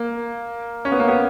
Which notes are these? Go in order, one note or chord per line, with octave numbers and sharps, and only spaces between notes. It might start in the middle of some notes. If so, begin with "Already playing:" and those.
Already playing: A#3
C#4
B3
A#3
B3